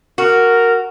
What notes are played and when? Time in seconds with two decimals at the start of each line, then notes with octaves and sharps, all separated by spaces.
0.18 F#4 A#4